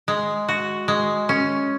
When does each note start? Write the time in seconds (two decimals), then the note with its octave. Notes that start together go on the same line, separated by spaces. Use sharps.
0.08 G#3
0.49 F#4
0.88 G#3
1.29 C#4